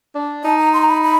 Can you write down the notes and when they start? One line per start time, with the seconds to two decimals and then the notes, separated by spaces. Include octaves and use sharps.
0.15 D4
0.44 D#4 A5
0.58 A#5
0.73 C6
0.82 A#5
0.88 B5
1.02 B5